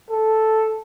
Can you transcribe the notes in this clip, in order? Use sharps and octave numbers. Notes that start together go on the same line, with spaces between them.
A4